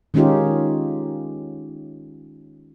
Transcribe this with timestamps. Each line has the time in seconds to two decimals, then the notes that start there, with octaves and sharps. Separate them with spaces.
0.14 D#3 G#3 C#4 D#4 F4 G4